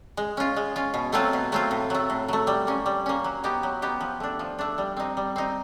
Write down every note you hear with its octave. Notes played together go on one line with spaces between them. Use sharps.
G#3
C#4 F4
G#3
C#4 F4
B2
F#3 A3 C4 F4
B2
F#3 A3 C4 F4
A2
F#3 A3
A2
F#3 A3
G3
A#3 C#4
G3
A#3 C#4
F#3
B3 D#4 G4
F#3
B3 D#4 G4
F3
A3 D4
F3
A3 D4
G3
C4 D#4
G3
C4 D#4